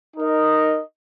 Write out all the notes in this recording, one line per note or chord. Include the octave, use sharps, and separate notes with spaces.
D#4 A#4 D#5